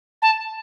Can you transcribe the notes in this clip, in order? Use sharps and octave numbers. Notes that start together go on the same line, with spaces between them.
A5